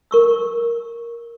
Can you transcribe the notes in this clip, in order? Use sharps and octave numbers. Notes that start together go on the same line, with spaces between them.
A#4 C#6 E6